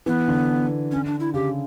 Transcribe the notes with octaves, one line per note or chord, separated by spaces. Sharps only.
E3 B3
D3
C#4
D4
E4
C#3 G4